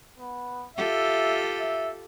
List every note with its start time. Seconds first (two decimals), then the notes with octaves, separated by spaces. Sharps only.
0.18 B3
0.77 F4 G4 A4 E5
1.59 E5